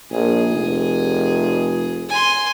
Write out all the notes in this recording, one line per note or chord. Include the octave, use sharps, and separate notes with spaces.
A#1 G#4
F1
G#5 C6